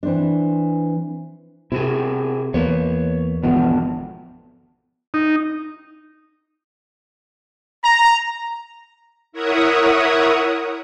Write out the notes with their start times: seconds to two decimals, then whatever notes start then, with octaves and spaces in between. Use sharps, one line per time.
0.03 E3 C4 D4
1.72 C3 E4 F#4 G#4
2.54 E2 A#3 B4 C#5
3.44 G#1 E2 B2 D3 F3 B3
5.14 D#4
7.83 A#5
9.32 E4 A#4 C#5 E5 F#5 D#6